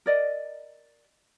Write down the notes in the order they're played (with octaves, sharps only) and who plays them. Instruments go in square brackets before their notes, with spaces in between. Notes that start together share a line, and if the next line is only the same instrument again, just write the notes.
[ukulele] A#4 D5 D#5